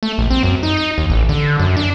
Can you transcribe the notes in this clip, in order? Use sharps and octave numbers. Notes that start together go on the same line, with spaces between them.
A3
A#1
C4
F#2
D#4
D#4
D#2
A1
D3
F#2
D4